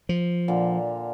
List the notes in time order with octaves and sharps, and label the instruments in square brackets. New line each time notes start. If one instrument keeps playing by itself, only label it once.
[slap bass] F3
[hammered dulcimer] A#2 D3